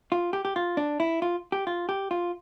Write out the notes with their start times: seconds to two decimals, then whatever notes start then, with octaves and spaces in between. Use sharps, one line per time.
0.12 F4
0.33 G4
0.45 G4
0.56 F4
0.77 D4
1.00 E4
1.22 F4
1.52 G4
1.67 F4
1.89 G4
2.11 F4